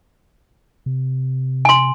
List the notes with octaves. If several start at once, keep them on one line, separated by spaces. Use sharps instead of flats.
C3
G#5 C6